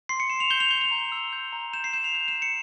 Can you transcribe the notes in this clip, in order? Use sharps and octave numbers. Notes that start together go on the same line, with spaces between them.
C6 C7
C#7
C6 E7
F7
G6 G7
F7
G6 G7
F7
A#5
E6
G6
A#5
G6 E7
C7
G6 E7
F7
G6 F7
E7
G6
C#7